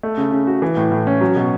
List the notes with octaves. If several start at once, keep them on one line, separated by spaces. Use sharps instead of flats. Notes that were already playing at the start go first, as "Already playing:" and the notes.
A3
C#3
C#3
F#4
E3
A2
A2
C#4
F#3
B2